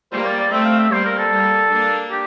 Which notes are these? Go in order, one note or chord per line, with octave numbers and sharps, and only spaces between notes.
G3 A#3 C5
D5
D5
A3 C4 E5
F5
E5
G3 A#3 C5
A#4
A4
G3 A#3
A#3 D4
G4